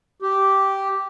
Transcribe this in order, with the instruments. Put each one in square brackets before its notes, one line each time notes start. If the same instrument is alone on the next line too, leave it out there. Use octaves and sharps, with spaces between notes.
[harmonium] G4